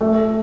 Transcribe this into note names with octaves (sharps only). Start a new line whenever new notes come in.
A3